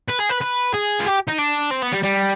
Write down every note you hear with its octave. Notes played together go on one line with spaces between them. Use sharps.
B4
G#4
B4
B4
G#4
F4
G4
D#4
D4
C4
B3
G3
G3